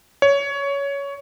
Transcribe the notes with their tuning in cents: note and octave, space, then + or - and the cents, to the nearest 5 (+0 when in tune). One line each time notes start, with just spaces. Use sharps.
C#5 +15